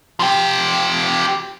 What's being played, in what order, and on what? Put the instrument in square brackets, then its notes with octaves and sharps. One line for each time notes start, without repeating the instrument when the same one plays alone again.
[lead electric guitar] F3 G4